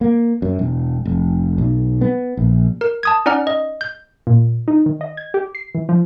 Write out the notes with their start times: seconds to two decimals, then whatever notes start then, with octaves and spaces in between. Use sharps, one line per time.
0.01 A#3
0.42 F#2
0.59 E1
1.05 F1
1.58 B1
2.01 B3
2.37 A#1
2.81 A#4
3.03 A5 D#6 G#6
3.26 C#4 D#4 D5 F#5 A#5 F6
3.47 D#5
3.81 G6
4.27 A#2
4.68 D#4
4.86 D#3
5.01 D#5
5.17 G#6
5.34 G4
5.55 C7
5.75 E3
5.89 F3